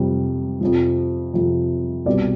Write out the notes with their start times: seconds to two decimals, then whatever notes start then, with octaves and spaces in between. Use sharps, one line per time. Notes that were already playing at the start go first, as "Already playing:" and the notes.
Already playing: F2 C3 G3
0.61 F2 C3 F3
1.34 F2 C3 F3
2.06 C2 B2 G3 D5